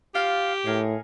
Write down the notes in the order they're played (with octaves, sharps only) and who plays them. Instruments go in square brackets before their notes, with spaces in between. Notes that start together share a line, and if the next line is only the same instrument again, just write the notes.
[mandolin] F4 F5 [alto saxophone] G4
[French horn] A2 [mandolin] D#4 G#4 A#4